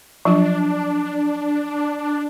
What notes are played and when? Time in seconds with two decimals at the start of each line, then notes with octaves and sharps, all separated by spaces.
0.25 F3 F#3 D4 F4